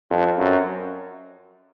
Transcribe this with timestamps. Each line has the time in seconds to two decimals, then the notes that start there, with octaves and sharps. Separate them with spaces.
0.10 F2
0.38 F#2